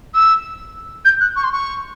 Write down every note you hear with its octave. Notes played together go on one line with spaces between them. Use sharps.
E6
G6
F#6
C#6
C6
C#6